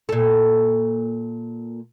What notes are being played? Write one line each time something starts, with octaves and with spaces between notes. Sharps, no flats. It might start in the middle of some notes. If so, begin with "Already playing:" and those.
A#2 A4